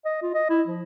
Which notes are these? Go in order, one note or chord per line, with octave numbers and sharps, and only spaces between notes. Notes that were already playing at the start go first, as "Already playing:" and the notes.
D#5
F4
D#5
E4
F3